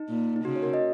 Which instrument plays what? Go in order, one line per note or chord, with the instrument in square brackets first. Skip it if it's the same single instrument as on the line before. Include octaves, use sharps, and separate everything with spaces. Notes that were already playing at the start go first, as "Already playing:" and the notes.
Already playing: [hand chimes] D#4
[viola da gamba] A#2
[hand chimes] D#4
[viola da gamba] C#3 [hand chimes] F#4
[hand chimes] C#5
F#4 A#4
D#5